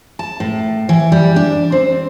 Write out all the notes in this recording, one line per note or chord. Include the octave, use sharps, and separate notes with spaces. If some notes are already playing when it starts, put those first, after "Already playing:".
A5
A2
E3
G3
D4
C4